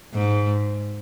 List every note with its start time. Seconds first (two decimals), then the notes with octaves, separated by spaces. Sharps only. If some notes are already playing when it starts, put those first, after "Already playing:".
0.14 G#2